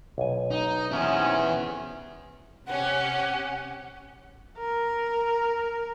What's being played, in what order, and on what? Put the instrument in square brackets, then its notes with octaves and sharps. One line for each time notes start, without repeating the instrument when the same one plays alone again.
[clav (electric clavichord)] B1 G#5
[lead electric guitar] D#4
[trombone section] C3 C#4 [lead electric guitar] B3 E4
[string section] C3 C#4 G4 [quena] F#5
[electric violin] A#4